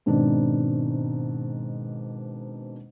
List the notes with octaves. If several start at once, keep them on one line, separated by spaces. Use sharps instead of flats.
G#2 B2 D#3 C4 D4